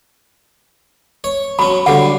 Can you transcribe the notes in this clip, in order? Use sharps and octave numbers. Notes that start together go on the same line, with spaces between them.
C#5
F#3 C#4 B5
D3 F#3 G3 F#5